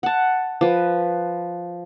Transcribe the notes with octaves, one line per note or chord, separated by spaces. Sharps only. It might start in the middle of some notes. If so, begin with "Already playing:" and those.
F#5 A5
F3 B4